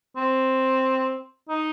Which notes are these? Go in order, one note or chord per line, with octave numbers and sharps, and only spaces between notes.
C4
D#4